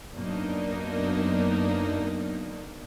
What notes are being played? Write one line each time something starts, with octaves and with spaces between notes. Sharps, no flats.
F#2 A#3 B3 D4 D#4